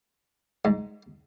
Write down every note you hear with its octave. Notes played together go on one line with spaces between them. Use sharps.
G#2